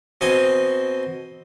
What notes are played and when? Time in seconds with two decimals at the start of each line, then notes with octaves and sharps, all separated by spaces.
0.21 B2 C4 D#5 G#5